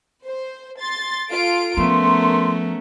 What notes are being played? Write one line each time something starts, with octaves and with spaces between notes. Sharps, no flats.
C5
C6 A6
F4 A4 D7
F3 A3 B3 C#4 A#4 C6